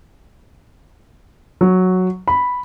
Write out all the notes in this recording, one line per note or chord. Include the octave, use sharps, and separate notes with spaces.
F#3
B5